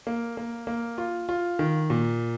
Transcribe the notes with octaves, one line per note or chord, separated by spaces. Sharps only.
A#3
A#3
A#3
F4
F4
D#3
A#2